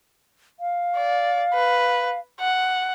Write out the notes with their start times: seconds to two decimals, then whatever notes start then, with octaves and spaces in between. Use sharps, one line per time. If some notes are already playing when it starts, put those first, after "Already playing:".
0.60 F5
0.97 D5
1.54 B4
2.40 F#5